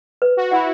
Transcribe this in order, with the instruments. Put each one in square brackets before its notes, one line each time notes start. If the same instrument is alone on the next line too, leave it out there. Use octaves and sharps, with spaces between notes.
[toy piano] B4
[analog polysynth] F#4
[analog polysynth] E4 [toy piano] F#5
[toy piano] B5